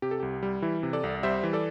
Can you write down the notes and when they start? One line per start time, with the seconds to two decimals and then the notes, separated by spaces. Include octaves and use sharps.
0.02 C3 G4
0.11 A4
0.20 C2 G4
0.43 G3
0.62 E3 E4
0.83 C3
0.93 A4 D5
1.04 C2
1.23 G3 C5 E5
1.44 E3
1.53 A4 D5